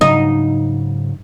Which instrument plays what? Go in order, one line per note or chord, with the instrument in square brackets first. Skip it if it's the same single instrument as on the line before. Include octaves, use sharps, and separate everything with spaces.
[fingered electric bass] G#2 C#3 F#3 [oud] D#4